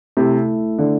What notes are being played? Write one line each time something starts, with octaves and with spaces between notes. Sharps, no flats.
C3 A3 E4 A4
D3